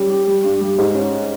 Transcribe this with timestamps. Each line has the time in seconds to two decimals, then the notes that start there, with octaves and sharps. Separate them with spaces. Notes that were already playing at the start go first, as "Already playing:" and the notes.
Already playing: G3 C#4
0.10 G4
0.27 G3
0.44 G2
0.61 G3
0.78 G#2
0.94 C#4